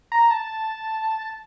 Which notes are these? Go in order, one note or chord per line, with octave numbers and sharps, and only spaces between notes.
A#5
A5